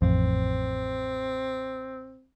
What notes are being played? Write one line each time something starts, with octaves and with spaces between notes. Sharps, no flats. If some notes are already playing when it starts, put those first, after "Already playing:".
A1 F2 C4